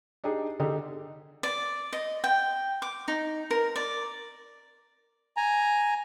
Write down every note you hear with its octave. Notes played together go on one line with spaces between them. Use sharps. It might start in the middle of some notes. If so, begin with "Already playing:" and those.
D4 D#4 G4 G#4
D3 D#4 G4 G#4
D5
D#5
G5
D6
D#4
A#4
D5
G#5 A#5